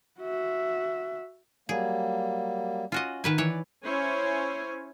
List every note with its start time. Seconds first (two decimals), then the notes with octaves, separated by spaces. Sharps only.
0.20 F#4 E5
1.69 F#3 G3 A#3 G#4
2.92 C#4 F4 F#4 D#5
3.24 D#3 B4 G#5
3.38 E3 C#5 D5
3.84 C#4 E4 C5 C#5 G#5